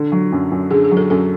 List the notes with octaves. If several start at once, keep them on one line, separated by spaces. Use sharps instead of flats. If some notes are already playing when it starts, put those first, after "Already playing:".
Already playing: D3
F#3
F#2
F#2
D3 G#4
G#4
F#3
A4
F#2 A4